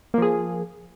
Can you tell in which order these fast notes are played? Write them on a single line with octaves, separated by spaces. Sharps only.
A#3 F3 G#4